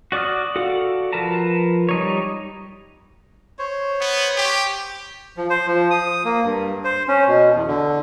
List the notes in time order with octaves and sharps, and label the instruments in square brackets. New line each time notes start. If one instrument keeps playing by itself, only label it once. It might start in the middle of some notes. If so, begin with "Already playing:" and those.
[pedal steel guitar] F#4 D5 D6 D#6 F6
F#4 A4 D5 F5 F#5
F3 A#4 B4 A5 A#5
G3 D#4 C#5
[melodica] C5 C#5
[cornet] B3
G4
[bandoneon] F3
C5
F3
D#6
A#3
G2
C5
C#4
B2
E2
D3